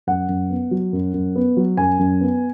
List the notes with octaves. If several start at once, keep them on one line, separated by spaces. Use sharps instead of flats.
F#2 F#5
F#2
B3
F#3
F#2
F#2
B3
F#3
F#2 G#5
F#2
B3